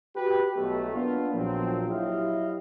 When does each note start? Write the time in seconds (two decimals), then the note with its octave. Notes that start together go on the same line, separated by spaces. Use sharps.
0.16 F#4 G4 B4
0.56 B1 B2 A3
0.93 A#3 B3 D4 F4
1.33 A#1 F3 F#3 A#3 C4
1.88 F#3 E4 G4 C#5 D#5 F5